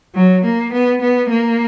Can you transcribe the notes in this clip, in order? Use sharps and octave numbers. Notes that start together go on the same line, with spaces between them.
F#3
A#3
B3
B3
A#3